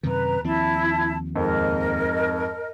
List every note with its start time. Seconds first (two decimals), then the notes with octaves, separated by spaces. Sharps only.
0.03 F#2 C3 D#3 B4 A#5
0.44 D#2 F3 C4 E4 A5
1.36 F2 G#2 A#4 D#5